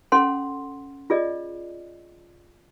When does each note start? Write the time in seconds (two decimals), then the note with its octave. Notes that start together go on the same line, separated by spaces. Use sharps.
0.12 C#4 A4 F#5 C6
1.10 F4 G#4 D5 D#5